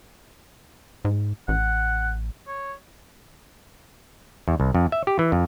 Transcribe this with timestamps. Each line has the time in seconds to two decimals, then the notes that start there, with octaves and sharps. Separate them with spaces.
1.05 G#2
1.48 A1 F#5
2.47 C#5
4.48 E2
4.60 C2
4.75 F2
4.92 E5
5.07 G4
5.19 E3
5.32 F2